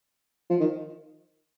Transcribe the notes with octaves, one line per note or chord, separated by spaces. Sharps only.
F3
D#3